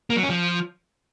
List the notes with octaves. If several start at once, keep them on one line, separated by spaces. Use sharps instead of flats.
A#3
F#3
C#4
F3